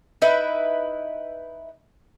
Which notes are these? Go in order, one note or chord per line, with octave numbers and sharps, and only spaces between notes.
D#4 E4 B4 E5